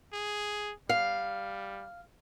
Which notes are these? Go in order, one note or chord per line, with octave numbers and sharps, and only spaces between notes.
G#4
G3 F5